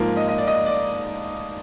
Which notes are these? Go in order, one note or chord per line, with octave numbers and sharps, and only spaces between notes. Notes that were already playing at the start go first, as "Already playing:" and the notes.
Already playing: G#2 F3 A#3
D#5
D#5
D5
D#5
D5